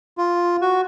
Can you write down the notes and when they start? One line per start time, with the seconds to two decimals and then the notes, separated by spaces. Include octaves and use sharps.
0.18 F4
0.62 F#4